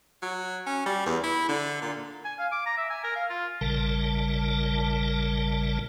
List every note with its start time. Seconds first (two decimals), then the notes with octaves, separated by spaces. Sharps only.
0.22 F#3
0.67 C#4
0.86 G3
1.06 E2
1.23 E4
1.49 D3
1.82 A#2
2.25 G#5
2.39 F5
2.52 D6
2.66 A#5
2.77 E5
2.90 G#5
3.04 A#4
3.16 F5
3.30 F4
3.61 A1 A#2 C#3 G3 A#4 A5